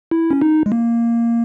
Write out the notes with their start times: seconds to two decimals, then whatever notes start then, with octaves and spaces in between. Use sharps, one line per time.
0.11 E4
0.31 C#4
0.41 D#4
0.66 G#3
0.72 A#3